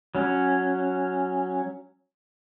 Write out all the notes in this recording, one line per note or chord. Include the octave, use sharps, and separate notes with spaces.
F#3 C#4